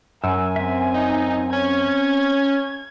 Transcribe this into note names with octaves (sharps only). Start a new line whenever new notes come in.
F#2 G#5 E6
C4 E5
D#4
C#4 G#6